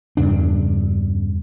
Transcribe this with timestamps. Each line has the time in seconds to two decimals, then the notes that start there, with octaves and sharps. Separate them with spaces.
0.17 E2 G2 C#3 D4